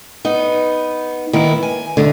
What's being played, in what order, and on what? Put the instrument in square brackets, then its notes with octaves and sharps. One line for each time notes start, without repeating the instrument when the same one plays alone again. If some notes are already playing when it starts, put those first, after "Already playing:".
[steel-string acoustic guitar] B3 D#4
D#3 A#3 B3 E4
G#5
E2 B2 D3